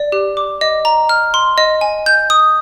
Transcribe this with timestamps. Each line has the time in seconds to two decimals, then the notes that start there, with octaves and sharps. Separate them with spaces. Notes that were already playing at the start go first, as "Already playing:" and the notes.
Already playing: D5
0.12 G4
0.37 D6
0.61 D#5
0.85 A#5
1.09 F6
1.34 C6
1.58 D#5
1.81 G#5
2.06 G6
2.30 D#6